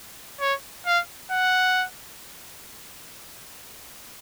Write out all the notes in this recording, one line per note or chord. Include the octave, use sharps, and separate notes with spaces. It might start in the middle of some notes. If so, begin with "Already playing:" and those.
C#5
F5
F#5